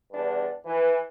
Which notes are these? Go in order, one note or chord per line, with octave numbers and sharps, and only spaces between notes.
E2 G2 D4
E3